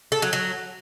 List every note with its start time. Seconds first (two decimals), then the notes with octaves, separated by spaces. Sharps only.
0.12 A4
0.22 F#3
0.33 F#3